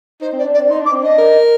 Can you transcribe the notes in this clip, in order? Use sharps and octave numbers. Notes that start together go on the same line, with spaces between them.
D#4 C5
C4 D5
D4
D5
C4
D#4 C6
D4 D6
C4
D4 D#5
A#4